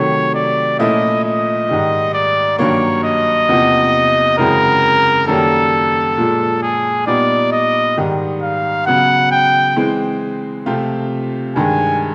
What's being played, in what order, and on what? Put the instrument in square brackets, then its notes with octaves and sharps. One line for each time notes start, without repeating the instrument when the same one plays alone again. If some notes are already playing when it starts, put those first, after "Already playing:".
Already playing: [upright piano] C3 D#3 F#3 A3 [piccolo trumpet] C#5
[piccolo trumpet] D5
[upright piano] A#2 F3 A3 C#4 E4 [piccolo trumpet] D#5
[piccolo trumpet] D#5
[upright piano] G#2 D#3 G3
[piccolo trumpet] D5
[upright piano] G2 D#3 F#3 A#3 [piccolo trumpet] C#5
[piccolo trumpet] D#5
[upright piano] E2 C3 F3 A#3
[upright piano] F#2 C#3 E3 G#3 C4 [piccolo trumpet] A#4
[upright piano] F#2 D#3 G3 A#3 C#4 [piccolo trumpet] A4
[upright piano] A#2 F3 G#3
[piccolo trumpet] G#4
[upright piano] A#2 G3 B3 D#4 [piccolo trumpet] D5
[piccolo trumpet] D#5
[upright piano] G#2 D#3 G3
[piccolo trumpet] F5
[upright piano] C#3 F#3 B3 [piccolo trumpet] F#5
[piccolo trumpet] G5
[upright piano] E3 G#3 C4
C3 F3 A3 C4 F4
[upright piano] G2 D#3 G#3 [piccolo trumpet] G#5